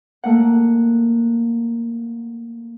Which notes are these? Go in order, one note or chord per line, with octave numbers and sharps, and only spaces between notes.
A3 A#3 F#5